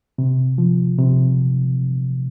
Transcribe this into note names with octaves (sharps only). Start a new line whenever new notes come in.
C3
F3
C3